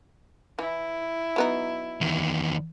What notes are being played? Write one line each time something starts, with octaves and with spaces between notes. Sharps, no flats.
E3 E4
F#3 B3 D#4
E2 D#3